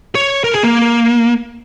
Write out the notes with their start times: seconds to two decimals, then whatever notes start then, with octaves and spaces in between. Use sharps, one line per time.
0.15 C#5
0.44 A#4
0.53 G#4
0.63 A#3